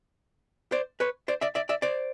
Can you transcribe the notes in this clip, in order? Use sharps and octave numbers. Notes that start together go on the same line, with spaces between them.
C5 D5
B4 C#5
C5 D5
D5 E5
D5 E5
D5 E5
C5 D5